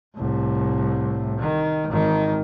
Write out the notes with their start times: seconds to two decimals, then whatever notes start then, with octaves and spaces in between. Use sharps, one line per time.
0.15 C2 A2
1.40 D#3
1.88 G#1 D#3